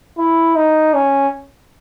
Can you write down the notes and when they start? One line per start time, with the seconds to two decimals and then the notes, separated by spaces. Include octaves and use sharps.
0.19 E4
0.56 D#4
0.94 C#4